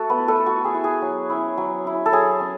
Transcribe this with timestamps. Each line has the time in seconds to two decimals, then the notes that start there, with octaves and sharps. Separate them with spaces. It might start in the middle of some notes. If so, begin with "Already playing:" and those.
Already playing: A3 F#4 A4
0.09 B3 B4
0.18 E4
0.28 A3 A4
0.46 A3 F#4
0.65 G#4
0.74 E4
0.84 G#4
1.02 F#3
1.30 C#4 E4
1.57 F#3
1.84 C#4 E4
2.06 A4
2.12 F#3 G#4
2.40 C#4